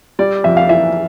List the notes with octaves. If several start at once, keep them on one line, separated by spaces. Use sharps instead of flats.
G3 D5
F2 E5
F5
E3 E5